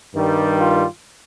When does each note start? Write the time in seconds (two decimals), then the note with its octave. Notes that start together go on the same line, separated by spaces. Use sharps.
0.14 G2 D#3 G3
0.59 F4